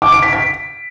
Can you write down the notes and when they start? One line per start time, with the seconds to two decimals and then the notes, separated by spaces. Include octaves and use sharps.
0.02 D6
0.12 D7
0.23 B6
0.33 B6